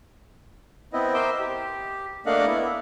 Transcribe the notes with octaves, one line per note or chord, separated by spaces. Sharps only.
B3 C4 E4 D#5
A#4 C5 D#5 E5 G5 D6
G4
A3 A#3 D4 D#5 F5 F#5
B3 E4